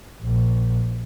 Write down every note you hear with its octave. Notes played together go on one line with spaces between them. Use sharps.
A#1